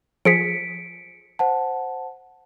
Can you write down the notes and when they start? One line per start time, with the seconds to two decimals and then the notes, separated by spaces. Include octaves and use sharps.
0.25 F3 G#4 B6 C#7 D7
1.39 C5 F#5 A5